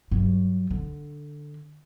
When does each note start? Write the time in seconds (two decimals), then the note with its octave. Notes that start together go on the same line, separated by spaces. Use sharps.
0.11 G2 F#3
0.70 D3